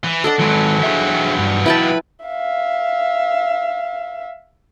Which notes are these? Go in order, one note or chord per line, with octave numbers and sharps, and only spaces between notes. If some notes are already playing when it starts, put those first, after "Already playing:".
E3
D4 A4 D#5 F#5
D#3 E3 F#3 G#3
D4 G#4 E5
G2
E4 B4 G5 A5
E5 F5